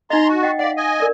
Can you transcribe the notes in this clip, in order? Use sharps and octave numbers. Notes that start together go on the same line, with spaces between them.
D#4 D#5 A#5 C6
F#4
D#5 F#5 G5
D5 F5 F#5
D#5 G#5
A#4 D5